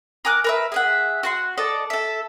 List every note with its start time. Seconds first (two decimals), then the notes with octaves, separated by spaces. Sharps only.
0.25 A#4 G#5 D6 F#6
0.44 A#4 B4 E5
0.72 G#4 E5 F#5
1.23 F#4 F#5 C6
1.57 A4 D5 D#5 A5
1.90 A4 E5